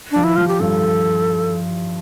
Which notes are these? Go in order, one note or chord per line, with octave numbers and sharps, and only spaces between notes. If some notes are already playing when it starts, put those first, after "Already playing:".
F3 D4
E4
F3 F4
G4
G2 A4